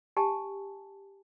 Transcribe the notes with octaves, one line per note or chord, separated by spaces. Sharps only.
G4 G#5 A5